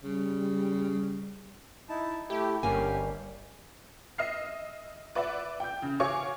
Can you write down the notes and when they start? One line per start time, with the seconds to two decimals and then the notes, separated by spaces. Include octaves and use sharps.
0.04 C#3 G3
1.89 D#4 E4 A5
2.30 A3 E4 G4
2.63 G1 G2 A#3 C#4 G4 G#5
4.18 D#5 E5 F6 C7
5.15 B4 D5 E5 F#5
5.60 G5 G6
5.82 C#3
6.00 F#4 C#5 F5 G#5 C#6 D6